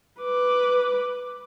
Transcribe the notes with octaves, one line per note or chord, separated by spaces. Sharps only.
B4 D6